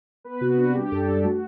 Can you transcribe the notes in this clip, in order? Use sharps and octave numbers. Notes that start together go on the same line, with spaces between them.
B3 B4
C3 F#4
D4 F#4
G3 G4
F#2 A4
D4 G4
A3 F#4